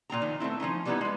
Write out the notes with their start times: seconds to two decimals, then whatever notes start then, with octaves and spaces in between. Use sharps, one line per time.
0.10 A#2 C4 G5 A#5
0.22 D#3 F3
0.40 A3 B3 C4 E4
0.60 F3 A3 C#4 D#4
0.85 E3 G3 A#3 B3 D#4 E4
1.01 G#3 B4